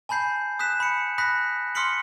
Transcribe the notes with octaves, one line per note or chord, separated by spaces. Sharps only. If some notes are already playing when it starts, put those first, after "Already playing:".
G#5 A5 B5 G6 C7
D#6 F#6 B6 E7
B5 C#7
B5 D#6 F#6 A#6 B6
C6 D#6 F6 B6 C#7 F#7